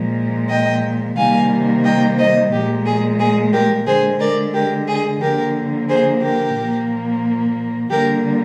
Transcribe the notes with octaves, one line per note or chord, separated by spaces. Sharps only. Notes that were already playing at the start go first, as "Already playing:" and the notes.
Already playing: A#2 F3 G#3
D#5 G5
C3 D#3 G3 A#3 F5 G#5
D#5 G5
C5 D#5
A#2 F3 G#3 G4
G#4
G#4
G4 A#4
D3 G#3 G#4 C5
A#4 D5
G4 A#4
G#4
D3 F3 A#3 G4 A#4
G#4 C5
G4 A#4
A#2 F3 A#3
D3 G3 A#3 G4 A#4